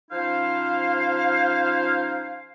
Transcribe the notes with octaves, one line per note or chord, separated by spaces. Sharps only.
F3 C#4 D#4 E4 C5 F5